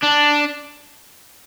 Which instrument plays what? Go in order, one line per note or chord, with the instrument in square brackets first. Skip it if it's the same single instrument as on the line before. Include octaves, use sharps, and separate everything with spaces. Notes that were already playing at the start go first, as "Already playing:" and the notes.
[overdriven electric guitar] D4